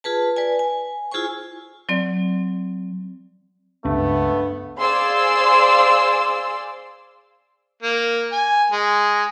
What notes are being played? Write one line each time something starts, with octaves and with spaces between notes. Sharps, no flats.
F4 G#4 B4 A5
B4 D5 G#5
G#5
E4 F4 G#4 C5 G#5 C#6
F#3 C4 D5
C#2 G2 A3 B3
G#4 C5 D5 F5 C6 E6
A#3
G#5
G#3